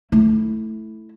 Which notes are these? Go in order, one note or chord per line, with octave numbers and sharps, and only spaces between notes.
A3 E4